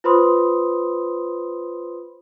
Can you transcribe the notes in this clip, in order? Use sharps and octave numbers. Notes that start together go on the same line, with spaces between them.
F4 B4 C5 B5 C6 D#6